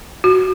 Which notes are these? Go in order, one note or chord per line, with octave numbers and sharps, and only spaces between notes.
F#4